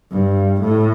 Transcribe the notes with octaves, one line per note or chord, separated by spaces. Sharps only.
G2
A2